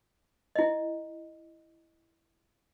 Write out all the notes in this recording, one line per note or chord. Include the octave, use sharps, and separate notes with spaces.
E4 D#5